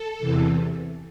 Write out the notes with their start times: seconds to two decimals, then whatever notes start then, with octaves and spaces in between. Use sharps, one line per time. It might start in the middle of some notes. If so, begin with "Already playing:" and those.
Already playing: A4
0.19 E2 C3 E3